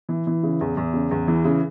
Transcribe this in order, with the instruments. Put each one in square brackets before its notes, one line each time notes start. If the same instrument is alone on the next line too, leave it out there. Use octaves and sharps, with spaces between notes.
[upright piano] E3
E3
C#3
E2
E2
C#3
E2
E3
C#3